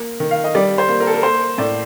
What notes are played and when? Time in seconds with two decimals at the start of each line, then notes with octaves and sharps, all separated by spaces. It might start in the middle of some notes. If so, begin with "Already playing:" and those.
Already playing: A#3
0.20 D#3
0.31 F5
0.44 D#5
0.55 G3 D5
0.78 C5
0.89 A#3
1.00 A#4
1.07 A4
1.14 A#4
1.23 A#3 C5
1.58 A2 D5